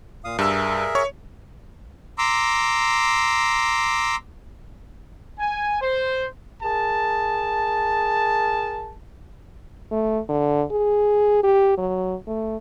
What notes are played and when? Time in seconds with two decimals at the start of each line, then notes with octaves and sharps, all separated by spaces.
0.24 A#2 F5 D#6
0.39 G2 G#4 A#4 E5 E6
0.95 C#5 C#6
2.18 A#5 C6 D6 E6
5.39 G#5
5.81 C5
6.63 G#4 A#4 A5
9.91 A3
10.29 D3
10.71 G#4
11.43 G4
11.78 F#3
12.27 A3